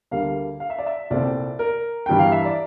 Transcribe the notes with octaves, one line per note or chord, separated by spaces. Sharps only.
D2 D3 G3 A#3 F5
F5
E5
D5
E5
C2 A#2 A3 C4 D5
A#4
G2 E3 G3 G5
F5
E5
D5